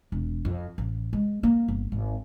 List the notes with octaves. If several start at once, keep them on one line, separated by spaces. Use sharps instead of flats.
E1
F2
A1
G#3
A#3
G1
G#1